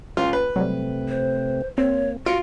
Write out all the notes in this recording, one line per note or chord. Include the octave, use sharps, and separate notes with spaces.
C#2 F4
B4
C3 F#3 G3 A3 C4
C5
A#3 C4 C#5
F4 F#4 C#7 D7